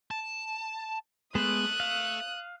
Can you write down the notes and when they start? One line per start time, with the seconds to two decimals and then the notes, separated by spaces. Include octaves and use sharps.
0.11 A5
1.35 G#3 B3 A4 E5 D#6 F#6
1.80 F5